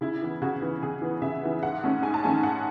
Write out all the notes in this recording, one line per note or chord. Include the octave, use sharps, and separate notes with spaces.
C#3 E4
E3 B3
C#3 F#4
E3 B3
C#3 G#4
E3 B3
C#3 E5
E3 B3
G#2 F#5
D#3 A3 C#4
G#2 G#5
A5
D#3 A3 C#4 G#5
G#2 F#5